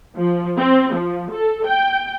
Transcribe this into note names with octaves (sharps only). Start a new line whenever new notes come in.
F3
C4
F3
A4
G5